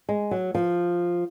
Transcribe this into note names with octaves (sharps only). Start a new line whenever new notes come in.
G#3
F#3
F3